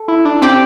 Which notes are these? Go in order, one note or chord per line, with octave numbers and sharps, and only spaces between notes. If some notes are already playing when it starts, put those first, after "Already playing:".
Already playing: A4
E4
D4
C4 G4 D5 G5